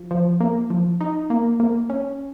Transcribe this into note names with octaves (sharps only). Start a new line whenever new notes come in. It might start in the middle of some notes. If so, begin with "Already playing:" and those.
Already playing: F3
F3
A#3
F3
D#4
A#3
A#3
C#4